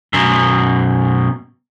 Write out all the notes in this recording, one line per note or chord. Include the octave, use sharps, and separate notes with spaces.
F#2 B2